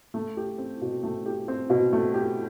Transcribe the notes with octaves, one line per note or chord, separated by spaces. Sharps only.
A3
G4
C4
B2
A3
G4
C4
B2
A3
G4